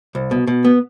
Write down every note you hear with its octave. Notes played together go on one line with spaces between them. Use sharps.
C2
B2
B2
B3